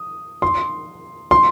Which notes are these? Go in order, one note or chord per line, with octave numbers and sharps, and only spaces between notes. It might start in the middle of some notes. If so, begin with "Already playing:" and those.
Already playing: D#6
C6
C6